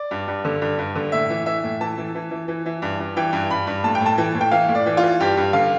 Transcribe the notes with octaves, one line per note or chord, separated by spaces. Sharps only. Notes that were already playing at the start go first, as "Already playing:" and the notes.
Already playing: D5
G2
G2
D3
G2
G2
D3
A2 E5
E3
E3 E5
A2
E3 A5
E3
E3
E3
E3
E3
G2
G2
E3 G5
G2
G2 B5
G2
A2 A5
G5
A2
A5
E3
A2
G5
E3 F5
A2
D5
E3
F4
E3
G2 G4
G2
D3 F5